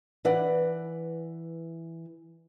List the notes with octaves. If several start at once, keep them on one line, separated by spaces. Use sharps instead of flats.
E3 B4 D5 F#5